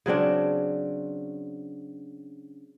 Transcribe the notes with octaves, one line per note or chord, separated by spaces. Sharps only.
C#3 F#3 C4 D4